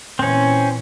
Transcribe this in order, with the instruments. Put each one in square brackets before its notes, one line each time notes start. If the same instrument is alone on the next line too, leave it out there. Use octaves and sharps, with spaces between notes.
[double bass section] A#2 E3 [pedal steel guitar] C4 C#4